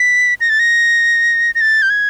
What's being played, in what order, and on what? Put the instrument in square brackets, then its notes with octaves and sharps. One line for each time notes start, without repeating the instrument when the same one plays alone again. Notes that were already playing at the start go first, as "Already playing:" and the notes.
Already playing: [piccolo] B6
A#6
A6
A#6
A#6
A6
G6
G#6